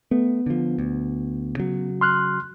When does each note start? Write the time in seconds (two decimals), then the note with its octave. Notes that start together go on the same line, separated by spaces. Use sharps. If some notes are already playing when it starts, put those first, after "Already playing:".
0.11 A3 B3
0.46 D3 F3
0.78 D2
1.57 C#3 F#3
2.01 C6 F6 F#6